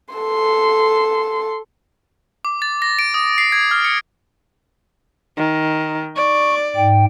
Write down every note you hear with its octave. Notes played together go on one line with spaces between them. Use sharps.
A4 C6
D6
A6
A#6
D7
D#6
C7
G#6
F6
C#7
D#3
D5 C#6
G#2 G5